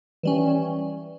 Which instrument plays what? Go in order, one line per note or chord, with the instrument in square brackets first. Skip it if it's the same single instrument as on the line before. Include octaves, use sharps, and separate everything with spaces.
[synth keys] E3 G3 C#4